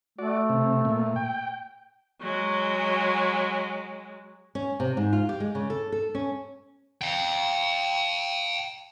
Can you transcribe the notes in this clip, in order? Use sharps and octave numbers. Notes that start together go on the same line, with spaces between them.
A3 F#4 D5
C3
A#2
G5
F#3 G#3
C#4
C3
G#2
F4
G4
G#3
C#3
A4
A4
C#4
F5 G5